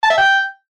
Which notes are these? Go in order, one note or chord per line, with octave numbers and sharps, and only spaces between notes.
A5
E5
G5